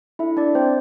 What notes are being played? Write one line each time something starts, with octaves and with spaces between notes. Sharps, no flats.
D4 E4 A4 E5
D4 D5
C4 C5